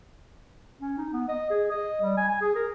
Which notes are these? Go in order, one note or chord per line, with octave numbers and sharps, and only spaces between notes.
C#4
D#4
B3
D#5
G#4
D#5
G3
G#5
G#5
G#4
A#4